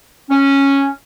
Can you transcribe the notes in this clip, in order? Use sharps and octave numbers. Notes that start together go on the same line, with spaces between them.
C#4